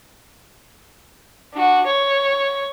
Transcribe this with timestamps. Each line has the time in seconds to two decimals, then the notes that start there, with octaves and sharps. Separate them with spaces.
1.53 D4 F#4
1.86 C#5